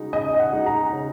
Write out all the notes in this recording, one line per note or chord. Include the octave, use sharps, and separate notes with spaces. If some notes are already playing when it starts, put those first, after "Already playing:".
Already playing: C#3 G#3 D#4 F#4
C#3 D#5
D#5
F#5
G#3 D#4 F#4
A#5
C#3